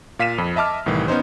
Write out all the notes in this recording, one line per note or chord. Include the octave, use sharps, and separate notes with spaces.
A#2 F5 B6 D#7 E7
F2
D#5 E5 A5 D6 F6
C2 A2 D#3 E3
B3 C#4 D#4 C5